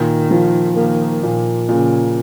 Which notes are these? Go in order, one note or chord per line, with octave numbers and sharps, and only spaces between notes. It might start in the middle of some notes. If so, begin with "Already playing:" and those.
Already playing: A#2 D#3
F3
D#3 A#3
A#2
A#2 C#3